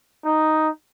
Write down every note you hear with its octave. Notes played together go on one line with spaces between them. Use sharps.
D#4